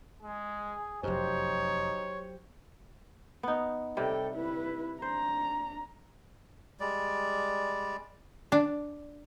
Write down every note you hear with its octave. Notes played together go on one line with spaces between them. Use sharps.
G#3 G#4
F1 F#2 F#3 D#4 G4 C5 C#5
B3 D#4
C3 G3 A4 G5
E4 B4
D4 C5 A#5
G3 G#3 D5
D4